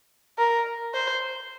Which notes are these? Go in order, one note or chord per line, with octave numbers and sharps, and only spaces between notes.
A#4
C5